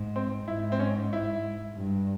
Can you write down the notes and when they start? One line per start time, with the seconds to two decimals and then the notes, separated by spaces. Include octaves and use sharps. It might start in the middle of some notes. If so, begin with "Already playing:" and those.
Already playing: G#2
0.16 C4
0.48 G#2 E4
0.72 C4
0.80 C#4
1.13 E4
1.77 G2